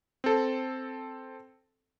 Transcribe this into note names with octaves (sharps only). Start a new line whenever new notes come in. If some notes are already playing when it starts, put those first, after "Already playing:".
C4 A4